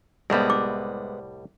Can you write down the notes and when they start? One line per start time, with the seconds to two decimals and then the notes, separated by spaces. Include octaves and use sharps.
0.30 C2 A2 G3 G#3 B3
0.50 D6